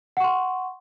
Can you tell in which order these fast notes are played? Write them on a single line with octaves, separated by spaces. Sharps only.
F#5 C#6 C6